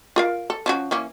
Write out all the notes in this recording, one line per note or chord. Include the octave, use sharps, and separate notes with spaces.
F4 A#4 F5
A4
F3 C#4 F#4
E3 A#3 C#4